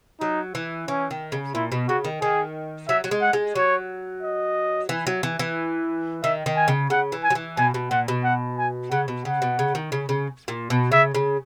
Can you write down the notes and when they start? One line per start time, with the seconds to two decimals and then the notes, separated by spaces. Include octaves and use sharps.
0.20 F#3 D#4
0.55 E3
0.88 E3 C#4
1.11 D#3
1.32 C#3
1.55 A#2 E4
1.72 B2
1.88 C#3 F#4
2.05 D#3
2.22 D#3 G#4
2.88 F#3 E5
3.04 F#3
3.11 G#3
3.22 F#5
3.33 G#3
3.55 F#3 C#5
4.22 D#5
4.89 E3
5.07 F#3
5.23 E3
5.39 E3
6.23 D#3 E5
6.46 D#3
6.56 G#5
6.68 C#3
6.90 C#3 F#5
7.12 E3
7.24 G#5
7.30 F#3
7.35 E3
7.57 B2 G#5
7.74 B2
7.91 A#2 F#5
8.08 B2
8.24 F#5
8.58 G#5
8.91 C#3 F#5
9.08 B2
9.25 C#3 F#5
9.42 B2
9.59 C#3
9.75 D#3
9.92 C#3
10.09 C#3
10.48 A#2
10.70 B2
10.92 C#3 E5
11.15 C#3